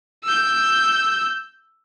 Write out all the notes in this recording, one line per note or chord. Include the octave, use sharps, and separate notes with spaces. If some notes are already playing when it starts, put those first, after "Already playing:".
E6 G6